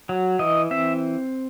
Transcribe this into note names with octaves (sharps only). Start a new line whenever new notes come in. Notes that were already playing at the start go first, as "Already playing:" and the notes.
F#3
E3 D#5
C4 E5